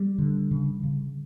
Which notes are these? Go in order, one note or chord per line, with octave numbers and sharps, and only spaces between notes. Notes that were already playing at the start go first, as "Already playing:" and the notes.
Already playing: G3
D3
C#3
C#3